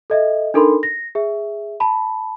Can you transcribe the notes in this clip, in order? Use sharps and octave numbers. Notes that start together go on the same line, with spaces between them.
A4 D#5 E5
D4 D#4 A4 A#4 B5 C6
A#6
G#4 E5
A5 B5